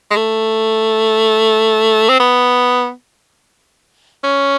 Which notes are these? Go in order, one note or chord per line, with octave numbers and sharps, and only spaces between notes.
G#3
A3
C4
B3
C#4